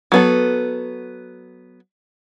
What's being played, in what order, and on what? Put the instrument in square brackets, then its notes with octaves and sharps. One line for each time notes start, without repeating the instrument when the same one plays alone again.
[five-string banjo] F#3 B3 A4